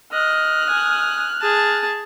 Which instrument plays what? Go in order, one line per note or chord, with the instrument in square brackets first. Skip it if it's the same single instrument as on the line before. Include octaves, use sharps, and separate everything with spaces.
[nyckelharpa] D#5 [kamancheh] F6 F#6
[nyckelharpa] G#5 D#6
G#4 A5